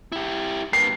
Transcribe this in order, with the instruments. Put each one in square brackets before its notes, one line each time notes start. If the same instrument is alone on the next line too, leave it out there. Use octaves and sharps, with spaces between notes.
[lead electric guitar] E4 G4
[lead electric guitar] G2 A#3 [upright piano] C7